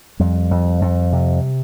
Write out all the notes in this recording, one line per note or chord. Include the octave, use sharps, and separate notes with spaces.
F2 G3
F2
F2
C3